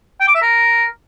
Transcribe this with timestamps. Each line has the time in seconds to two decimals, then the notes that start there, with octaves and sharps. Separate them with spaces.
0.21 G5
0.28 D6
0.35 E5
0.42 A#4